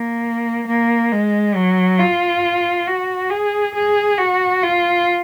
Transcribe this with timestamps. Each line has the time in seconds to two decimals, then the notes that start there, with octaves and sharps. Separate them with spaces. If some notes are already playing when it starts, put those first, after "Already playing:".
Already playing: A#3
0.67 A#3
1.12 G#3
1.55 F#3
1.99 F4
2.88 F#4
3.30 G#4
3.75 G#4
4.18 F#4
4.63 F4